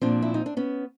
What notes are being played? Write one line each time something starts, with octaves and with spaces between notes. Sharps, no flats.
A#2 F3 C4 D4
E4
D#4
D4
B3 C#4